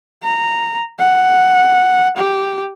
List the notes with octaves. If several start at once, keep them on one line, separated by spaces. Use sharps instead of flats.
A#5
F#5
G4